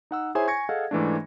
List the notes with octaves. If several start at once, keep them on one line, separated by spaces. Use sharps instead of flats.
D#4 F#5 E6
E4 G#4 C5 C#5 E5 G#5
G#5 C#6 G#6 A#6 C#7
G#4 A4 D#5 F5 F#5
G#2 E3 A3 D4